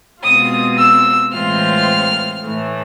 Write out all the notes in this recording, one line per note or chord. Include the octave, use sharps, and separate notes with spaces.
B2 G#3 C4 F4 D#6
E6
A2 E3 G#3 C4 F4 F6
A2 E3 A3